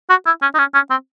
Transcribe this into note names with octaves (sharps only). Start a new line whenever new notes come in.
F#4
E4
C#4
D#4
C#4
C#4
C4